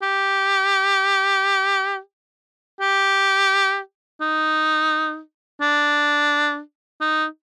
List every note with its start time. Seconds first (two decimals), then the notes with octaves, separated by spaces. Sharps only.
0.02 G4
2.81 G4
4.21 D#4
5.61 D4
7.01 D#4